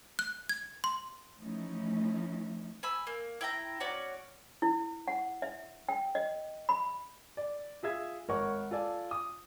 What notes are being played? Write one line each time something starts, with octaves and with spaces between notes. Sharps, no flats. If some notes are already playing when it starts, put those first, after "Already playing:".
F#6
G#6
C6
E3 F3 A3 C#4 D#4 E4
G#5 B5 E6
A#3
E4 G5 A#5
C#4 F#4 D5
E4
F#5
E5
G5
D#5
B5
D5
F4 G#4 E5 G#6
G#1 A#4 C#5 F#5 C#6
F4 A4 D5 G#5
D#6